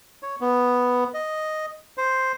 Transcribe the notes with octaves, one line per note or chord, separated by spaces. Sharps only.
C#5
B3
D#5
C5